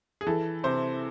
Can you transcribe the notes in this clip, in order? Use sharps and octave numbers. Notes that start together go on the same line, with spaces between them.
G#4
E3 A4
C3 C5